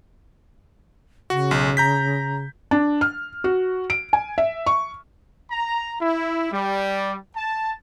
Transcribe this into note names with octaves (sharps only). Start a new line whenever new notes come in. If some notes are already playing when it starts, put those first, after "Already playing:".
C#3 F#4
B1
A#5 G6 B6
D4
F6
F#4
D7
G#5
E5
C#6
A#5
E4
G3
A5